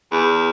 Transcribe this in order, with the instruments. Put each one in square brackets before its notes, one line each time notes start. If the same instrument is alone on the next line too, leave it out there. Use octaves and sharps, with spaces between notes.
[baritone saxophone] E2